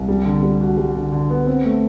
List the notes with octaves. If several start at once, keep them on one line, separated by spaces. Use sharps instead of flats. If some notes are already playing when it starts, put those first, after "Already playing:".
Already playing: C2
G3
D3
G3
F#4
G3
D3
D3
B3
C4
A3